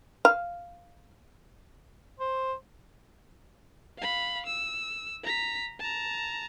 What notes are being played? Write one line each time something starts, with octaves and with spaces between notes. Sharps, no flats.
F5
C5
F5 B5
E6
A#5 B6
A5 A#5